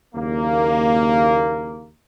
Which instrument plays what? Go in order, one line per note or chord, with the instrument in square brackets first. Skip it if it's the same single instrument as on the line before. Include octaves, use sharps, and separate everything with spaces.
[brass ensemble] F#1 D#2 A#3